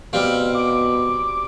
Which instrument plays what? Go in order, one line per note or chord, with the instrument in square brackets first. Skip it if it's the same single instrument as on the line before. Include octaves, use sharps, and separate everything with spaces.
[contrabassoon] B2 [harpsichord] G3 C4 [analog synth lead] F5
[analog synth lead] D6